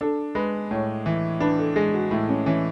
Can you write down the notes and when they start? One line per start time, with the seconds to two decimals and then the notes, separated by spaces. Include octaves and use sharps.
0.01 D4 A4
0.35 G#3 B4
0.71 A2 C#5
1.06 E3
1.40 D4 B4
1.58 A4
1.76 G#3 G#4
1.94 F#4
2.11 A2 E4
2.29 C#4
2.46 E3 C#4